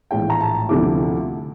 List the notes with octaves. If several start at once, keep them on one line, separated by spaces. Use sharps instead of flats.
A#1 A2 E3 G5
A#5
A5
D2 C3 F3 A3 E4 D6